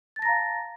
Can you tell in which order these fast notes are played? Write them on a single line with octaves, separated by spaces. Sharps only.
A6 A5 A#6 A#5 F5